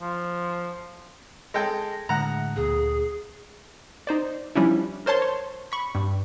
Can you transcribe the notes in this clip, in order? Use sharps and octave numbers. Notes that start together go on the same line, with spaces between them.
F3
G#3 A4 G5 A#6
A2 D3 G#3 F#5 A#5
D2 A#2 G#4
D#4 C5 D5
F3 G3 C#4 D4 E4
A#4 C5 C#5 A5 C6
C#5
B5 C#6
G2